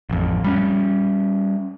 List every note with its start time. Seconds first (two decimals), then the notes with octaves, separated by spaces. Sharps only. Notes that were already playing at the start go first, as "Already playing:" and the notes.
0.10 A1 F2
0.44 G3 C#4